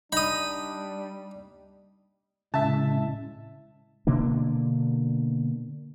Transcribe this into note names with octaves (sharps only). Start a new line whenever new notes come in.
G3 D4 D#4 B5 D#6
A2 C#3 G#3 E5 A5
B2 D3 A#3 D4